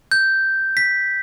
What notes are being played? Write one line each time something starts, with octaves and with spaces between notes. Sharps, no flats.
G6
B6